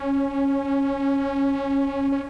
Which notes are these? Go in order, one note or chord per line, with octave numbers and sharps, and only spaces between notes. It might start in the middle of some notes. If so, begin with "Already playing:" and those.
Already playing: C#4
C#4